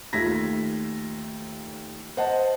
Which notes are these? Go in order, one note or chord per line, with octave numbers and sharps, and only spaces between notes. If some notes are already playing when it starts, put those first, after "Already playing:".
D#2 A3 F4 G#6 A#6 B6
C5 D#5 F#5 A5